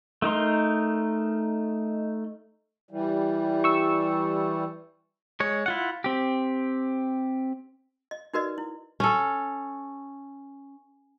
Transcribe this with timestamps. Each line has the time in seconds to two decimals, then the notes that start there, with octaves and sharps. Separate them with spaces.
0.22 A3 D#4 A#4 C6
2.91 E3 G3
3.64 C#6 E6
5.40 G#3 C#5
5.66 E4 F4 F#5
6.04 C4 G4
8.11 D#5
8.34 D#4 F#4 A#4 B4 D5 D#5
8.58 E4
9.00 C#4 A4